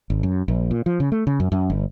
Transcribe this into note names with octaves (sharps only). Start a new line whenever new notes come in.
G#1
F#2
A#1
A#2
F3
C#3
A3
C#3
F#2
F#2
G1